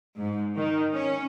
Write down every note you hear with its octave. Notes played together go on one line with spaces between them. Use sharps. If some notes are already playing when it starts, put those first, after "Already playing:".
G#2
D#3
C#4